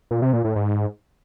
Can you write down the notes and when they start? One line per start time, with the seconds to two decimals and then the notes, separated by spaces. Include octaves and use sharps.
0.11 A#2
0.22 C3
0.33 A#2
0.44 A2
0.56 G#2